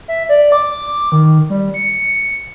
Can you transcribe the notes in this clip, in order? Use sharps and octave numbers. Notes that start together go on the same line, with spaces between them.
E5
D5
D6
D#3
G3
C#7